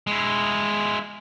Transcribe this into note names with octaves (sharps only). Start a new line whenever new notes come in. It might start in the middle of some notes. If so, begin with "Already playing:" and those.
G#3 E4